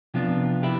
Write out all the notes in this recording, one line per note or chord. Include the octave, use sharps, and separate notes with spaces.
C3 F3 B3 D4 F4
E4 G4